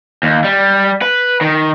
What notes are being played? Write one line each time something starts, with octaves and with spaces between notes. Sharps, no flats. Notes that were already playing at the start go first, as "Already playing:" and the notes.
D#2
G3
B4
D#3